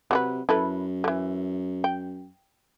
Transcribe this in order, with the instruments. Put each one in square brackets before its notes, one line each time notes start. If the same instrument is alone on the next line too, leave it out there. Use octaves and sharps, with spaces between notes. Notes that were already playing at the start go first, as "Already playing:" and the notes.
[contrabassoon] C3 [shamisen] F#3 F#4 B4
[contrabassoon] F#2 [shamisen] E4 A4 B4
[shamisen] D3 E3
G5